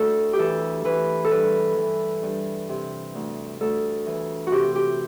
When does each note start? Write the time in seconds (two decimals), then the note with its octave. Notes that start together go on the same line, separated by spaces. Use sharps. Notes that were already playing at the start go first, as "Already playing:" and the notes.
Already playing: D2 E4 A4
0.33 G4
0.38 E3 A4
0.85 E3 B4
1.24 A4
1.31 G2 B4
1.77 E3
2.23 G2
2.69 C3
3.15 D2
3.61 D2 A4
4.07 E3
4.47 F#4
4.52 C3 G4
4.75 G4